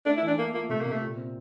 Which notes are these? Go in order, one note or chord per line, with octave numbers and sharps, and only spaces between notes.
A3 D4
E4
E3
D4
A3 A#3
A#3 F4
C3 A3
C3 A#3
A3
A#2
C4